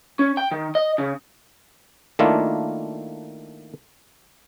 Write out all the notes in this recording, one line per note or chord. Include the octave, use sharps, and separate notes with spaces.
C#4
G5
D#3
D#5
C#3
D#3 A3 A#3 D4 E4 F4